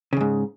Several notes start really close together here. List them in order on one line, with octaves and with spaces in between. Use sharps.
C#3 E2 G#2